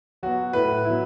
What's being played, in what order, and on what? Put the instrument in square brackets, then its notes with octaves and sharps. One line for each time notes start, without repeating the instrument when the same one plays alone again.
[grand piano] F#3 B3 F#4
A2 B4
F#3 B3 E4